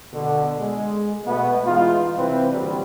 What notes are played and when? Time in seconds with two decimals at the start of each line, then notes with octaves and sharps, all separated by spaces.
0.13 B2 D3
0.59 G#3
1.25 B2 A3 B3
1.66 E3 G#3 D#4 F4
2.16 C3 E3 G3 C4 B4
2.52 A#2 D3 F#3 G3